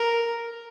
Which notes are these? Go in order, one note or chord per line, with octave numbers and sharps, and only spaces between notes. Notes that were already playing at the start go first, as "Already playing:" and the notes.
Already playing: A#4